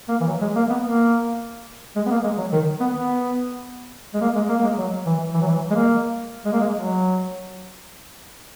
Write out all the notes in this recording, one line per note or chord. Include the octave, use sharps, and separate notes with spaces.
A#3
E3
F#3
G#3
A#3
B3
A#3
G#3
B3
A#3
G#3
F#3
D#3
B3
B3
G#3
A#3
G#3
A#3
A#3
G#3
F#3
E3
E3
F#3
E3
G#3
A#3
G#3
A#3
G#3
F#3